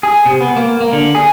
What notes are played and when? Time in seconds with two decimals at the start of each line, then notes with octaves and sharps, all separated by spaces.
0.03 G#4
0.25 C3
0.41 B3
0.56 A#3
0.81 A#3
0.93 D3
1.15 G#4